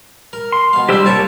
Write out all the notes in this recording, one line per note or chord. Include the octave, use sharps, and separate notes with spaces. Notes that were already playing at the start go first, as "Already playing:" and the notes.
A#4
C6
B2 F5
G3 D4 G4 C5 E6
C2 A#3 C#5 A5 C#6